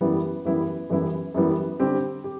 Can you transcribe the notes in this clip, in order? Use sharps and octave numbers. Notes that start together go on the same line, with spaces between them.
F#2 E3 G3 B3 E4
F#2 E3 G3 B3 E4
F#2 E3 G3 B3 E4
F#2 E3 G3 B3 E4
D3 G3 C4 G4
G4